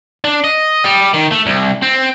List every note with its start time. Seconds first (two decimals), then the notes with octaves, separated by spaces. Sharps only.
0.24 D4
0.44 D#5
0.85 G3
1.14 D#3
1.32 A3
1.47 C2
1.83 C4